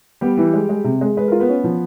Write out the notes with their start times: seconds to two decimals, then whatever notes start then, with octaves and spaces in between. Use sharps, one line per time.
0.21 G3 B3 G4
0.37 E3
0.53 G#3
0.69 G#3
0.84 C3
1.01 G#3
1.17 G#3 B4
1.28 F4 A#4
1.40 B3 B4
1.48 C#4
1.64 F3